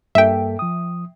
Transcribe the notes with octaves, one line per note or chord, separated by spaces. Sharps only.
G2 A#3 A4 E5 G5
F3 D#6